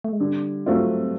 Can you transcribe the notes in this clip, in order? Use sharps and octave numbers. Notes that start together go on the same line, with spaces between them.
A3
G#3
D3 G3
F#3 A3 C4 F4